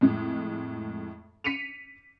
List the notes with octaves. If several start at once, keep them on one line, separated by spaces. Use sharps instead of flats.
F2 A2 G#3
B6 C#7 D#7 F7